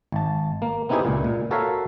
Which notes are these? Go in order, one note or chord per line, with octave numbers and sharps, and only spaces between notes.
G#1 A5
A#3
B3 C4 D#4 E4 G4 G#4
C#2 A#2
A#2
F#4 A4 A#4 C#5 E5 F5